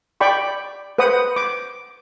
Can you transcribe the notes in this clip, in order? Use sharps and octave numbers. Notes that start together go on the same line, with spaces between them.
D5 G5 B5 C#6
B4 C5 F#5 D#6
D6